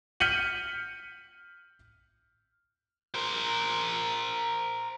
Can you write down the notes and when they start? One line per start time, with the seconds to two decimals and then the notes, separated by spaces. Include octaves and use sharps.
0.20 F6 G6 B6 C#7 D#7 F#7
3.15 A#4 C5